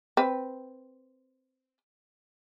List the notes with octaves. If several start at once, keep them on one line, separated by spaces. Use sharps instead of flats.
C4 B4